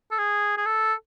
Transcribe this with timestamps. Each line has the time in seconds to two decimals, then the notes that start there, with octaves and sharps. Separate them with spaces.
0.11 A4
0.18 G#4
0.57 G#4
0.66 A4